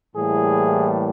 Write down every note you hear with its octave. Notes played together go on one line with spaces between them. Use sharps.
A2 E3 G3 A#3 G#4